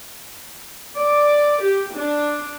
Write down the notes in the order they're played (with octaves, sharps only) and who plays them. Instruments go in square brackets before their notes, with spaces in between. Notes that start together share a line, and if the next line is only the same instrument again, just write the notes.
[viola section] D5
G4
D4